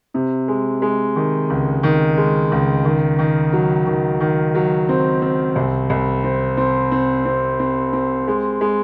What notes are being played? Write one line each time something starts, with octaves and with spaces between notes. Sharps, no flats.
C3
G#3
G#3
D#3
C#2
D#3
G#3
C#2
D#3
D#3
F#3
D#3
D#3
F#3
C4
C4
C2
C2
C4
C4
C4
C4
C4
C4
G#3
G#3